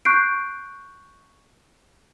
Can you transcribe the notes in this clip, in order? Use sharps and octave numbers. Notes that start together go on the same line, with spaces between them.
C#6 F#6 G6 C7 D7